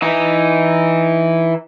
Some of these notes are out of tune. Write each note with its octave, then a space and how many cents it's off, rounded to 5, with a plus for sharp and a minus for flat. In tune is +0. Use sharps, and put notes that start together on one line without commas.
E3 +0 D#4 +0